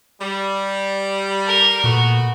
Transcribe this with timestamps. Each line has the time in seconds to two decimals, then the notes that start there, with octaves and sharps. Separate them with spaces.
0.21 G3
1.46 A#4
1.84 A#2 A3 B3 F#4